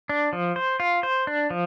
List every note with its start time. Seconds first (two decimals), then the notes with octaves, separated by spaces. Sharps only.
0.09 D4
0.33 F3
0.56 C5
0.80 F4
1.03 C5
1.27 D4
1.50 F3